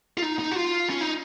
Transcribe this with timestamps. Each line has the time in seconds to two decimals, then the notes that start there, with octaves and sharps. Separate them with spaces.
0.17 F4
0.22 D#4
0.39 D#4
0.51 F#4
0.56 F4
0.90 C#4
1.01 D#4